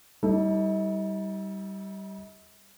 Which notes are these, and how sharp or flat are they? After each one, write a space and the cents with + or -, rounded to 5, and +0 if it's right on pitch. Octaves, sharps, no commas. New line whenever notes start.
G3 -10 D#4 +45 A4 +0